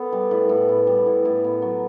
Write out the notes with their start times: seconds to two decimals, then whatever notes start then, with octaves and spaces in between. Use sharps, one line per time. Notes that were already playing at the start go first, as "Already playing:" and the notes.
Already playing: B3 A4
0.12 G3
0.31 A2 B4
0.49 A2
0.69 B3
0.87 G3
1.06 A2
1.25 A2
1.44 B3
1.62 F#3